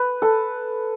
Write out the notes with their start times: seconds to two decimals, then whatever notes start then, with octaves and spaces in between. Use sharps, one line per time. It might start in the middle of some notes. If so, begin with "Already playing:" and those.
Already playing: B4
0.22 A4